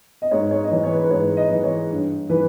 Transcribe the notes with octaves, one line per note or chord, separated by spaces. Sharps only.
D#5
G#2 C#5
C#5
D#5
E3 C#5
C#5
B4
B4
G#2 C#5
D#5
E3
C#5
G2
E3 B4